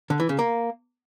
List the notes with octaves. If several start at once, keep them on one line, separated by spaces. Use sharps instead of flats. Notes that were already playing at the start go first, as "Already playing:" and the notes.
D3
E3
C#3
A#3